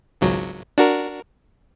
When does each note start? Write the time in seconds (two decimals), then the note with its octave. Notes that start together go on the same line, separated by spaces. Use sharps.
0.21 G#1 C#2 F#3
0.78 D4 F#4 A#4